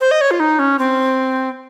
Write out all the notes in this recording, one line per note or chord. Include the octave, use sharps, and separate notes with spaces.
C5
D#5
C#5
F4
D#4
C#4
C4